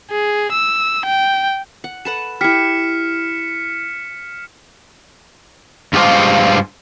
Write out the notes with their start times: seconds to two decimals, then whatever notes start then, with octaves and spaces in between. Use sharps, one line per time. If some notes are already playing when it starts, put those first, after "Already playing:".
0.11 G#4
0.52 E6
1.06 G5
1.84 F#5
2.05 A4 B4 F#5 E7
2.41 E4 G4 F6 B6 C#7
5.93 G2 G#3 F4 G4 C5 F5